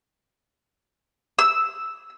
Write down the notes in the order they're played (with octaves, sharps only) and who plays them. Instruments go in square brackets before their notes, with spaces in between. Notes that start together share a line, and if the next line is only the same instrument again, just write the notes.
[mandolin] E6